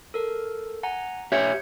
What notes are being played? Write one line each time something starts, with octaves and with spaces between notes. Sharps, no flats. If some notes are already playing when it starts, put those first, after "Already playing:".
A4 A#4
F#5 G#5 A#5
G4 C#5 E5 G6 G#6 C#7